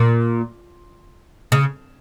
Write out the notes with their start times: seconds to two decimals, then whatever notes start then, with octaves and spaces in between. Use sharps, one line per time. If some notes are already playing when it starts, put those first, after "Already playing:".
Already playing: A#2
1.52 C#3